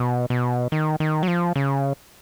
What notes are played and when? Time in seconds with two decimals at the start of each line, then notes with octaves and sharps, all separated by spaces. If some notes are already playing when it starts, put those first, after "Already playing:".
Already playing: B2
0.30 B2
0.72 D#3
1.00 D#3
1.23 F#3
1.28 F3
1.56 C#3